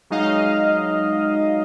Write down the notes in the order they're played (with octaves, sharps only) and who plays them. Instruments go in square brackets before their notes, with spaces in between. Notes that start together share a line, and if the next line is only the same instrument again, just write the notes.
[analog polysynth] F#3 G#3 D#4 D#5 F5